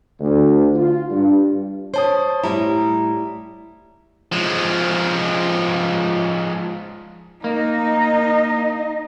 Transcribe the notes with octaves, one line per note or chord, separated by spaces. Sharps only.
D2
F4
G2
C5 C#5 A5 D#6
A2 G3 E4 A#5
F3 G#3
A#3 D#4 D#5